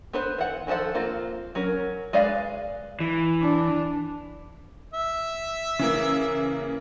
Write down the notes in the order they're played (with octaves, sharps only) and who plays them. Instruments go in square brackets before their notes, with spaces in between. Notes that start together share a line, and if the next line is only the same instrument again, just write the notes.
[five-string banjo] B3 B4 C5
E3 F#5
D#3 F3 A4 C5 F#5
A#3 C4 F4
F#3 C#4 A#4
G#3 B4 D5 F5
[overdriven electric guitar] E3
[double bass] D4
[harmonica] E5
[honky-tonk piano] C#3 E3 A#3